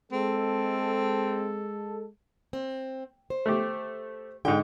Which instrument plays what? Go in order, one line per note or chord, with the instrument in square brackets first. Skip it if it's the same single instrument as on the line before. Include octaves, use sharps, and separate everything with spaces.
[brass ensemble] G#3 A4 [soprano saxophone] C4
[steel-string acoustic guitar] C4
C5
[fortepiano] A3 G4
[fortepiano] G#2 D3 [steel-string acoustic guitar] G5